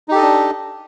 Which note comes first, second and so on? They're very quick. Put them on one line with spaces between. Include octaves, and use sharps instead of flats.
D#4 G4 A4 D#5 D4